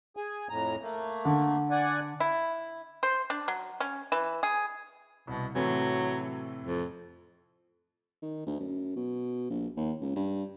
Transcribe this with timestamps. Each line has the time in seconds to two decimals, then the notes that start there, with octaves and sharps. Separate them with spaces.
0.17 G#4 G#5
0.49 F2 A2 A#5
0.82 A3 A#3
1.25 D3
1.71 D5 F#5 G#5
2.20 E4
3.03 C5
3.30 D4
3.48 F#3
3.80 C#4
4.12 E3
4.43 G#4
5.27 C2 B2
5.55 A2 C3 E3 F#3
6.64 F2
8.22 D#3
8.46 D2
8.59 F#2
8.96 B2
9.50 A#1
9.77 D#2
10.01 C#2
10.16 G2